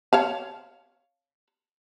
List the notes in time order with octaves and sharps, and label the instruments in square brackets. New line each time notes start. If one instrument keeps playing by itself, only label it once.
[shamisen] C#5 F5 A5